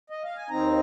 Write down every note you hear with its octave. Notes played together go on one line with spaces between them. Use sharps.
D#5
F5
G#5
D#2 D#3 C4 D#4 A#5